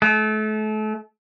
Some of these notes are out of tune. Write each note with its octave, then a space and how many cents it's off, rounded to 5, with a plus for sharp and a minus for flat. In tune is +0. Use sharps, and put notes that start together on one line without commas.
A3 -35